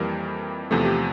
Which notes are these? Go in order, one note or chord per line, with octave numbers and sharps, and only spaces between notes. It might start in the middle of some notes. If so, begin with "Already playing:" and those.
Already playing: F2 E3 G3 A#3 A#4
E2 C3 F3 A3 A4
G4